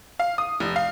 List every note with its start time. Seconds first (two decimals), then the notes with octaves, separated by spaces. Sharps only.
0.20 F5
0.38 D#6
0.60 F1
0.76 F5